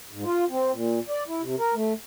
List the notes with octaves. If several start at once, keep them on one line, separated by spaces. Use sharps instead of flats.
G#2
F4
C4
A#2
D5
E4
C3
A#4
A3